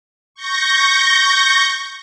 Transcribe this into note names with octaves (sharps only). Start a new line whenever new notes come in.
C#6 G6 A#6